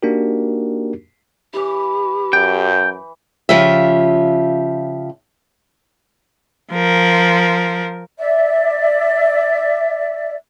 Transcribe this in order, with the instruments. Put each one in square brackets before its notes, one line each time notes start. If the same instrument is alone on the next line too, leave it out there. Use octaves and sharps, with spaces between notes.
[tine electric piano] A#3 D4 D#4 F#4 G4 A#4
[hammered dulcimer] E3 E4 [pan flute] G4
[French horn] F#2 [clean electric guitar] G5
[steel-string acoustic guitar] C#3 F3 F4 G4 E5
[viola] F3 A#4
[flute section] D5 E5